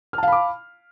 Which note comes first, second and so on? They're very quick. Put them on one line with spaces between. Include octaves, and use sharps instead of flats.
F6 A5 F5 B5 D6